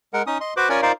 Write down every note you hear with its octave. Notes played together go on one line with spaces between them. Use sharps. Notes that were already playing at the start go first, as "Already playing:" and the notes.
G#3 A#4 F#5
C#4 D#4 D#6
D#5 C6
F#4 B4 C5 D6
C#4 F4 A#4 C#5 D5 G#5
D#4 F4 A#4 C5 D5 F5